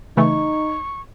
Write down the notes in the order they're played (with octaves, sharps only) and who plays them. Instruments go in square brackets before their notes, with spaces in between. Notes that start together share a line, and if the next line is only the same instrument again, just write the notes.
[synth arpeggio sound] C#3 E3 A3 [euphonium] D#4 [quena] C#6